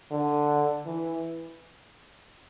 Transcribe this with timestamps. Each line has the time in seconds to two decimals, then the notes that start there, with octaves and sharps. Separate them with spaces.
0.11 D3
0.86 E3